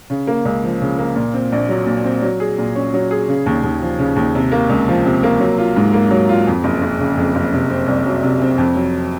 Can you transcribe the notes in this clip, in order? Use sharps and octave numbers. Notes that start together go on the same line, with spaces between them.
C#3
A#3
C#2
F3
C#3
A#3
A#2
C4
A#1
F#3
A#2
C4
F#3
G#4
A#2
C#4
F#3
G#4
C#3
D#2
D#2
F3
C#3
D#2
C3
A#3
C#2
F3
C3
A#3
F#3
F4
G#2
A#3
F#3
F4
F2
F#1
F#1
C#3
F2
F#1
C3
C4
C2
F#3
C3
C4
F2
F#3